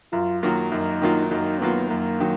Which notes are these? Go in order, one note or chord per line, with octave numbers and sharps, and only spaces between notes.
F#2 F4
D#3 F#3 A#3 F4
F#2 D#4
D#3 F#3 A#3 F4
F#2 D#4
D#3 F#3 A#3 B3 F4
F#2 A#3
D#3 F#3